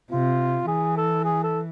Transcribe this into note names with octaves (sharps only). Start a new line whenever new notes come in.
C3 F4
E3 G#4
A4
G#4
A4